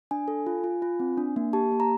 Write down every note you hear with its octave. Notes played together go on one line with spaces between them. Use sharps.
D4 G#5
A4
F4
F4
F4
C4
D4
A#3
G4 A5
A#3
A#5